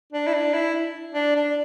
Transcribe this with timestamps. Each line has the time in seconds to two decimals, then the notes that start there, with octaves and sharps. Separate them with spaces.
0.13 D4
0.27 E4
0.34 D4
0.54 E4
1.15 D4
1.36 D4